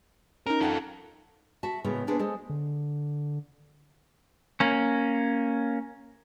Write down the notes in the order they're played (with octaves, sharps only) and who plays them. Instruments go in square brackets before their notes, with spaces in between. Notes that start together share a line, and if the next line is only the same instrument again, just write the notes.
[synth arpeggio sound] C#4 D#4 [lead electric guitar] A#4
[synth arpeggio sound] D#4 F#5 G5 [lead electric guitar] F4 A4
[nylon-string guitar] F#4 E5 A5
A2 C#3 G#3 A#3 B3 C#4
A#3 B3 D4 G#4 B4 C5
G#3 A4 C5 A5
[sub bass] D3
[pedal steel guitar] A#3 C#4